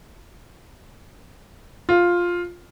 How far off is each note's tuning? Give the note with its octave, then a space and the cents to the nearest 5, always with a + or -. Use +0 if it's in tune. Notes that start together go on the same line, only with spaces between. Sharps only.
F4 +5